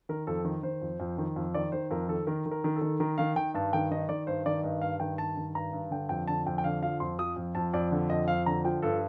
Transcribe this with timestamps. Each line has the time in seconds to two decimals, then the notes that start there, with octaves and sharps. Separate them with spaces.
0.09 D#3 A#4
0.27 F2 A4
0.45 D#3 A#4
0.63 D#3 C5
0.82 F2
1.00 F2
1.18 D#3
1.36 F2
1.54 D#3 D5
1.72 D#3 C5
1.91 F2 A#4
2.09 D#3 A4
2.27 D#3 A#4
2.46 D#3
2.51 A#4
2.64 D#3
2.76 A4
2.82 D#3
3.00 D#3 A#4
3.18 D#3 F5
3.36 D#3 G5
3.54 G2 A5
3.73 D#3 G5
3.91 D#3 D#5
4.09 D#3 D5
4.27 G2 C5
4.46 D#3 D5
4.63 G2 D#5
4.81 G2 F5
5.00 D#3 G5
5.18 G2 A5
5.37 D#3
5.55 G2 A#5
5.73 G2
5.91 D3 G5
6.09 F2 G5
6.28 D3 A5
6.47 F2 G5
6.58 G5
6.64 D3 F5
6.83 F3 F5
7.00 F2 C6
7.19 F3 D#6
7.36 F2
7.55 F2 A5
7.74 F2 D5
7.91 D3
8.10 F2 D#5
8.27 F2 F5
8.46 D3 A#5
8.65 F3 G5
8.82 G2 A4